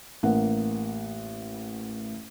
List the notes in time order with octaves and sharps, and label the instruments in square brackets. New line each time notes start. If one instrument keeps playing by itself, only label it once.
[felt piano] A1 A#3 F#5